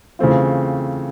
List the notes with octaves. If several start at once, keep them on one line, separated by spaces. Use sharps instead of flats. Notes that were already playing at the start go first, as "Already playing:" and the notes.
C#3 E3 A3 C4 F4